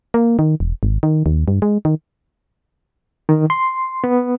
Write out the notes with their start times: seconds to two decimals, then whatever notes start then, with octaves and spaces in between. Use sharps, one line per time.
0.14 A#3
0.39 D#3
0.60 E1
0.83 G#1
1.03 D#3
1.26 D#2
1.48 G2
1.62 G#3
1.85 D#3
3.29 D#3
3.50 C6
4.04 B3